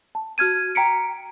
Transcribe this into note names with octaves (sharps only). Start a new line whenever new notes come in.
A5
F#4 F6 G#6 D#7
G5 A#5 B6 C#7 D7